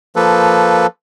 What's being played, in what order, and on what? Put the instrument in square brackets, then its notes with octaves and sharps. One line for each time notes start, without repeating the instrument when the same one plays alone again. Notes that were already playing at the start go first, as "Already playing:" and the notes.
[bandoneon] F3 A#3 A4 B4